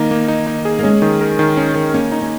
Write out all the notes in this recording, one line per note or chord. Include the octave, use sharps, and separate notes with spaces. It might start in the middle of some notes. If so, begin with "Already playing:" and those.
Already playing: D#3 A#3 D#4
A#3
D#4
D#4
G#4
A#3
G#3 C#4
D#3
A#4
D#3
C#4
D#3
A#3 C#4
D#4
C#4